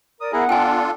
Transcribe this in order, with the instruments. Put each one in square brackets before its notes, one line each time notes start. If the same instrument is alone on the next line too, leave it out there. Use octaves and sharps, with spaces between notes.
[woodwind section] A#4 D5 [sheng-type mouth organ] D#6
[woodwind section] B3 F#5 [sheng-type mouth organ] E4 G#4 A#4
[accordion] D4 F4 [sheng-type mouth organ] A4 [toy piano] G5 G#5